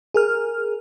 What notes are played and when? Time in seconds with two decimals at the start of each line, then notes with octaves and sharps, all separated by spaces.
0.14 G#4 A#4 F6